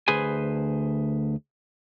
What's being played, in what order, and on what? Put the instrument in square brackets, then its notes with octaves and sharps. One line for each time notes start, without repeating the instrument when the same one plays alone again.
[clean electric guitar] D2 G#4 B4 C5 G#5